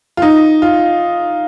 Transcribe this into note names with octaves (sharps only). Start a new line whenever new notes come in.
F4
D#4
F4